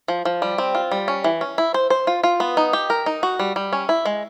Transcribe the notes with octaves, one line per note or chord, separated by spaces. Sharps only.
F3
F3
G3
C4
F4
G3
C#4
E3
C#4
E4
C5
C5
F4
F4
B3
D#4
G4
A#4
D#4
F#4
G3
G3
C#4
E4
G#3